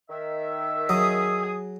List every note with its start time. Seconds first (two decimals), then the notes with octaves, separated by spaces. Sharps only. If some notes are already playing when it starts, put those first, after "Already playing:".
0.10 D#3 E5
0.89 F#3 G#4 D#6